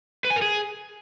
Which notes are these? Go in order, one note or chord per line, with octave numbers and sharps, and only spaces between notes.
B4
G#5
A#4
G#4